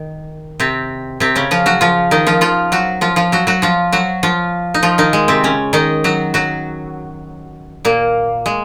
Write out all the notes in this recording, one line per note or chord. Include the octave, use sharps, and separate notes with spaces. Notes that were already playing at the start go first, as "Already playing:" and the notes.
Already playing: D#3
C3 C4
C3 C4
C#3 C#4
F3 F4
F#3 F#4
F3 F4
D#3 D#4
F3 F4
F3 F4
F#3 F#4
F3 F4
F3 F4
F#3 F#4
F#3 F#4
F3 F4
F#3 F#4
F3 F4
D#4
F3 F4
D#3 D#4
G#3
C3 C4
C#3 C#4
D#3 D#4
F#3 F#4
F#3 F#4
A#2 A#3
G#3